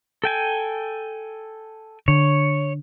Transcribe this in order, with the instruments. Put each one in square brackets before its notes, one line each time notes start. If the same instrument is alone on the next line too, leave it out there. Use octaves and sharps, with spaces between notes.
[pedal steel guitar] A4 G5 G#5
[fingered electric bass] D3 [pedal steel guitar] C#5